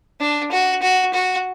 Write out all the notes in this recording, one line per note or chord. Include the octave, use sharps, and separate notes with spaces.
D4
F#4
F#4
F#4